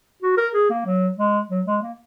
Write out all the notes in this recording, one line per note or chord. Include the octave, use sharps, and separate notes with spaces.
F#4
A#4
G#4
A#3
F#3
G#3
F#3
G#3
A#3